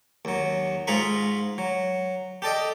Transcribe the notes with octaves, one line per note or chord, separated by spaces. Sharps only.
D#2 F#3
G#2 F4 G#4 A#5 B5 C#6
F#3
G4 A4 D5 D#5